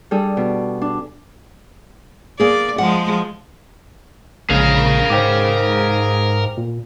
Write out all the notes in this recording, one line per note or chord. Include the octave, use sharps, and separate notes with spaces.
G3 D4 G#4 A4
B2
D4
A#3 G#4 D5
F3 G#3 F#5
A#1 C#3 G#3 G#4 A#4 F5
G#2 C5 G5 D6
A#2